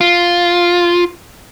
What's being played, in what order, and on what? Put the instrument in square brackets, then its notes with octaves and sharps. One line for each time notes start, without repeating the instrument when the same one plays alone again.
[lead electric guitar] F4